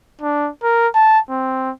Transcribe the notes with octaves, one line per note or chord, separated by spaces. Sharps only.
D4
A#4
A5
C4